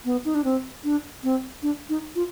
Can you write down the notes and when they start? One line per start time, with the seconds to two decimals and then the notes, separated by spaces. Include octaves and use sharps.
0.05 B3
0.25 D#4
0.35 D4
0.44 C4
0.84 D4
1.23 C4
1.63 D4
1.89 D#4
2.15 F4